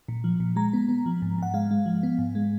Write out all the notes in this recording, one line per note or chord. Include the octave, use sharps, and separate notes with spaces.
A#2
F3
A#2
G#3 A#5
B3
B3
F3
G#2
G#2 F#5
G#3 F5
G#3
F3
B3
G#2
G#3